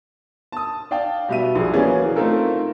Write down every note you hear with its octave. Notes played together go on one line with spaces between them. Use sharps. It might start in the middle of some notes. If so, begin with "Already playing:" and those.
A5 D#6
D5 F5 G5 A5
B2 G3 G4 E5 D#7
A#1 G#4
E3 F#3 A#3 C#4 G#4 D5
A3 C4 D#4 F4 A4 A#4